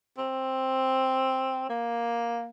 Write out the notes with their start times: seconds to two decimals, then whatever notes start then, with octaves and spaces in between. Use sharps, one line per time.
0.18 C4
1.69 A#3